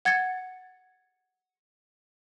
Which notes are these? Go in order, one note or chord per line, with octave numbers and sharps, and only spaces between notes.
F#5 G#6 A6 C#7